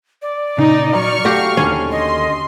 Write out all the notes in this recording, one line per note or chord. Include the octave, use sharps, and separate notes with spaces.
D5
A#2 C#3 D#4
F#3 C#6 F6
A3 F#4 G4 F5
D#2 D3 D#3 C#4
D#5 C6